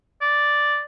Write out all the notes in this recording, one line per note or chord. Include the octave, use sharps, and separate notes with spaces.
D5